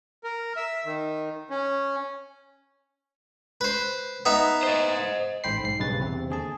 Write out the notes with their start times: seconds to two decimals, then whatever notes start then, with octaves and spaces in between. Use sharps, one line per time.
0.24 A#4
0.56 E5
0.86 D#3
1.50 C#4
3.61 B4 C5
4.25 B3 D#4 E5
4.63 C5 D#5
5.44 A1 G#2 C5 G5 B5 C7
5.61 B1 G#2 C7
5.79 B1 G2 C#3 B4 A6
6.00 E2 C3 C4
6.29 D#2 D3 G#4 A5